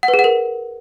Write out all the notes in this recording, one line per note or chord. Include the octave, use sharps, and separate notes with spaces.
F#5
B4
G#4
F#5
A#4